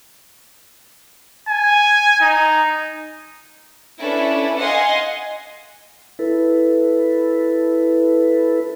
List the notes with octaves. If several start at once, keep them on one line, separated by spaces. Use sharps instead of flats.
G#5
D#4
C#4 D4 E4 A4 B4
D#5 F5 F#5 G#5 C6
E4 A4 B4